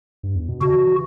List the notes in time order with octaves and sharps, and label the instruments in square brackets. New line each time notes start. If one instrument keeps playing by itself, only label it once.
[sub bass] G2
E2
B2
[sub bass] C#3 [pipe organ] F#4
[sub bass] E3
E3